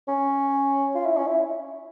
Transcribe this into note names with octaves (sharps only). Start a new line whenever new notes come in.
C#4
F4
E4
C#4
E4